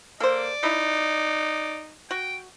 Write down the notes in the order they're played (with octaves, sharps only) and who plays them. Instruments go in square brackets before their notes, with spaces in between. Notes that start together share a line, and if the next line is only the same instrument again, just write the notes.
[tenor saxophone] A#3 [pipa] A4 C5 [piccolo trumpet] D5
[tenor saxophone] D#4 [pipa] E4
[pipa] F#4 [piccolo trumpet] G5